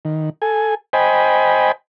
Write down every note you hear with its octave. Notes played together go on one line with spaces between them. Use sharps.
D#3
A4 G#5
C5 D#5 G5 G#5 B5